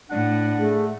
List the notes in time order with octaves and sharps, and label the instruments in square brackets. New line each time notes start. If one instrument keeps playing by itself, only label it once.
[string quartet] A2 [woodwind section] D4 F#5
[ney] A3 [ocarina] G#4